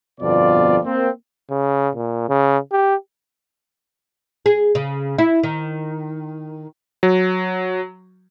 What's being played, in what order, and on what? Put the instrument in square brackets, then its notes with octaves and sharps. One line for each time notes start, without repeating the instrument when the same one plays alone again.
[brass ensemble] G1 F2 B2 F4 D5
A#3 C4
[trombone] C#3
A#2
C#3
G4
[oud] G#4
C#3
E4
D#3
[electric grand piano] F#3